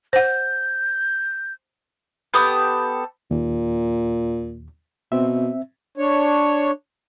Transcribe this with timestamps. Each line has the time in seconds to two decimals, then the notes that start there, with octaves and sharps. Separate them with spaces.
0.13 C5 F#5 G6
2.34 B3 G4 A4 D#6
3.31 D#2 A#2
5.12 B2 C4 E5
5.97 D4 C#5